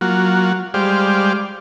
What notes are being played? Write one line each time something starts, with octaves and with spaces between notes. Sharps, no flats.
F#3 A#3 F4 F#4
G3 G#3 G4 C5 D5 F5